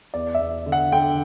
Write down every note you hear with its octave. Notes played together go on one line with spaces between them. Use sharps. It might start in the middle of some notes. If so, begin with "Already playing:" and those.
E2 D5
E5
E2
D3
F#5
D3 G5